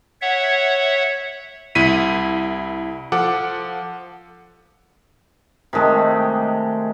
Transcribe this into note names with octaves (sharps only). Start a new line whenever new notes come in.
C#5 E5 F#5
C2 E4 B6 D#7
F3 A4 F#5 D6
C3 D#3 G#3 A3